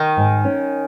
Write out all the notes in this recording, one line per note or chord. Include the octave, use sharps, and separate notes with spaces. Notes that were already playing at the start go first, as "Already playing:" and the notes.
Already playing: D#3
G#2
C#4